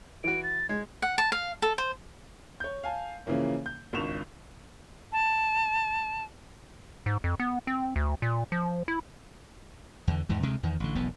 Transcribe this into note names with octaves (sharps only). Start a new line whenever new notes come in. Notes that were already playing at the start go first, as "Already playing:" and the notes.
E3 F#4 D7
A6
G#3 G#6
F#5
A5
F5
A4
C5
C#5 G6
F5 G#5 A5
C#3 E3 F3 A#3 C#4
G6
G#1 C#2 D4 C#6 E7 F7
A5
G#2
F2
B3
C4
D2
A#2
F3
E4
E2 D3
E2 G#2 E3
D2 C3 G#3
E2 D#3
A1 D3
E1 B1 F2 B3